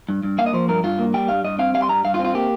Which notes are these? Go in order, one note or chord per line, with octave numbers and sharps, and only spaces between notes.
G2
G2
A#3 F5
D#5
F3 C5
G2 A#4
G2 F4
A#3
G3 G5
G2 F5
G2 D#5
C4 F5
G3 F5
C6
G2 A#5
G2 F5
F4
C4
F4
A#3 G4